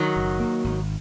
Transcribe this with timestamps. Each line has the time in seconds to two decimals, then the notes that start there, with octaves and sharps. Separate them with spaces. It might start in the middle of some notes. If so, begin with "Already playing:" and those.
Already playing: D#3 F#3
0.16 F#1
0.40 A#3
0.64 G#1